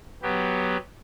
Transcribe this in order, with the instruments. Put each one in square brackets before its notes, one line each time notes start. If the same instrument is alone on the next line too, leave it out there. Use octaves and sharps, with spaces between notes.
[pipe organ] F#3 B3 G4